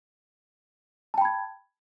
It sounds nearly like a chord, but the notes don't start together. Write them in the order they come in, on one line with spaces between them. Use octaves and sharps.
A5 G5 B5 G#6